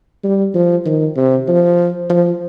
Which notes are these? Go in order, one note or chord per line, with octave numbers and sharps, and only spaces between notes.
G3
F3
D#3
C3
F3
F3